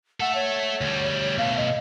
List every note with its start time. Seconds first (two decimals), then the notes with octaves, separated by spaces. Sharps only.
0.20 A4 E5 F#5
0.35 C#5
0.81 D2 G3
1.38 B2 A3 F5
1.57 D#5